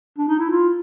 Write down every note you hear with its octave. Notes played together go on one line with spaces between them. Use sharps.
D4
D#4
E4
F4